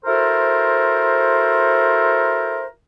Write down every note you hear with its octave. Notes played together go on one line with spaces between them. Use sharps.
E4 F#4 A4 A#4 C5